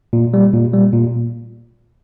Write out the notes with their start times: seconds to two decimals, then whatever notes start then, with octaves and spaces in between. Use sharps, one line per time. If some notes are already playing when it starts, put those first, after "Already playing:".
0.13 A#2
0.34 G3
0.54 A#2
0.73 G3
0.93 A#2